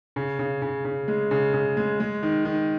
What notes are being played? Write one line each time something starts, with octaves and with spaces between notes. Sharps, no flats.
C#3
C#3
C#3
C#3
G#3
C#3
C#3
G#3
G#3
D#3
D#3